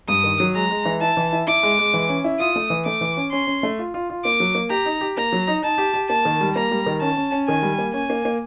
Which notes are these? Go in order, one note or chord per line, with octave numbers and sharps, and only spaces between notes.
G2 D#6
D#3
F#3
G#3 A#5
G#3
E3
E4 A5
E3
E4
E4 D6
G#3
G#3
E3
C#4
E4
F4 D#6
A3
E3
A3 D6
E3
C#4
C#4 C6
C#4
A3
F4
F4
F4
A#3 D6
F#3
A#3
G4 A#5
D#4
G4
A#3 A#5
F#3
D#4
D#4 A5
G4
G4
A#3 A5
D#3
G3
A#3 A#5
G3
D#3
C#4 A5
C#4
C#4
D#3 G#5
G3
A#3
C#4 G#5
A#3
A#3